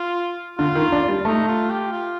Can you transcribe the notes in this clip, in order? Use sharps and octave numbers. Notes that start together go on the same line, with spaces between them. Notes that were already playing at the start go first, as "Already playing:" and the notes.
Already playing: F4
D3 F4
D#3
D4
G3
A3 D#4
F4
G4
F4